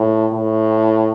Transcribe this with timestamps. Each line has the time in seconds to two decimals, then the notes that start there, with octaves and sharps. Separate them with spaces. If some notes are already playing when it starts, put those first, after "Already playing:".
Already playing: A2
0.33 A2